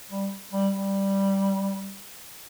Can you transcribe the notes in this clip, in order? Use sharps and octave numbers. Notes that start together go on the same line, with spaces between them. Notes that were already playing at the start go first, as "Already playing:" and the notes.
G3
G3
G3